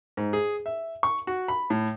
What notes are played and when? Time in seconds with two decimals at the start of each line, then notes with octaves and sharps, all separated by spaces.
0.17 G#2
0.33 G#4
0.66 E5
1.03 C#6
1.27 F#4
1.48 B5
1.70 A2